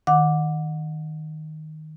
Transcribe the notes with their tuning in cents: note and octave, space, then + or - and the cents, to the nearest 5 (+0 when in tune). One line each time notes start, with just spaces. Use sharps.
D#3 +0 F#5 -25 D6 +0